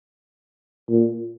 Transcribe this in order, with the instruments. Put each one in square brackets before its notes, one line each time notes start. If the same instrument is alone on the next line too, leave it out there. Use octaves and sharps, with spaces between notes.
[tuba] A#2